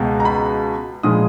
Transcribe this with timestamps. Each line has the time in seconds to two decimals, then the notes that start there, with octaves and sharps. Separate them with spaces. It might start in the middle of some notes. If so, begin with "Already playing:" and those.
Already playing: C#2 B2 G#3
0.20 A#5
0.25 B5
1.03 A#2 F3 G#3 D#6